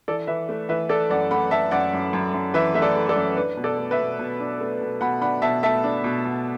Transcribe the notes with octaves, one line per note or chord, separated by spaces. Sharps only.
E3 A4 D5
E3 B4 E5
A3
E3 B4 E5
A3 A4 D5
F#2 D5 F#5
A3 F#5 B5
A3 E5 A5
F#2 D5 F#5
F#2
F#2
F#2
E3 B4 E5
A3 E5
A4 D5
A3
A4 D5
F#2
D4 B4
B2
A4 D5
A3
B4 E5
B2
B2
D4
A3
B2
B2 F#5 B5
D4 F#5 B5
B2 E5 A5
A3 E5 A5
D4
B2
B2